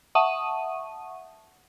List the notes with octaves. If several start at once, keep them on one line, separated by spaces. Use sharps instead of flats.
E5 F#5 A5 C#6 D#6 D#7